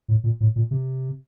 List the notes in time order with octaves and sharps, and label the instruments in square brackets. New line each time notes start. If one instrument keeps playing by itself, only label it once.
[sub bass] A2
A#2
A2
A#2
C3